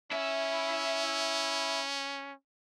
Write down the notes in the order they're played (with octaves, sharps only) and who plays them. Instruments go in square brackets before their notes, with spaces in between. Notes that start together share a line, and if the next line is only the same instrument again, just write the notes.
[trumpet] C#4 [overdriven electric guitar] E4 E5